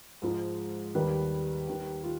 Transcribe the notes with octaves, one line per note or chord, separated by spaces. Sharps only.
G#2 F3 G#3
D#2 D#3 G3 B4
D#2 D#3 G3
F4